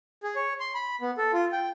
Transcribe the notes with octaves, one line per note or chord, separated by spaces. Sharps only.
G#4
C#5
C6
B5
B3
A4
F4
G5